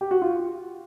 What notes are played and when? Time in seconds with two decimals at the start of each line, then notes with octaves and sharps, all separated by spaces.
0.01 G4
0.11 F#4
0.22 F4